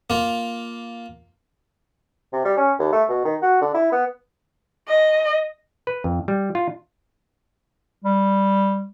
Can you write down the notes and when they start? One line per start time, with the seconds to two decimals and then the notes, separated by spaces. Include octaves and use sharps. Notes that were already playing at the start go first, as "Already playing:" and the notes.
0.10 A#3 F4
2.33 C3
2.45 G3
2.57 C#4
2.79 D#2
2.93 A3
3.09 B2
3.25 D#3
3.42 F#4
3.61 D3
3.74 E4
3.92 B3
4.88 D#5
5.87 B4
6.04 F2
6.28 G3
6.55 F4
8.04 G3